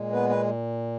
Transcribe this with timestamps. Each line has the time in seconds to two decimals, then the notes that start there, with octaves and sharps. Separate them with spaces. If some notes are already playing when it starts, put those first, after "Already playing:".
Already playing: A#2 G#3
0.12 B3 B4
0.29 B4